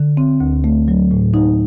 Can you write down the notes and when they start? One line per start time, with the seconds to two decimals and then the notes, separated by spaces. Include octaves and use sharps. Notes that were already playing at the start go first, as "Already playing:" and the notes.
Already playing: D3
0.17 C4
0.40 D2
0.64 A3
0.88 F#3
1.11 A2
1.34 D#4